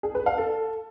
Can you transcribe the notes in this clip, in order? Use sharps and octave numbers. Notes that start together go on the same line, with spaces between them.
G#4
B4
F5
A4